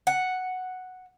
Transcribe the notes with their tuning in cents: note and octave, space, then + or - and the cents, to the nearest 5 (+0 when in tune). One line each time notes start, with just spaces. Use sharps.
F#5 +0